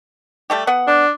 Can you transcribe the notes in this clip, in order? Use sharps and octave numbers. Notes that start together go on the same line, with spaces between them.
G3 A3 G4
B3 F#5
D4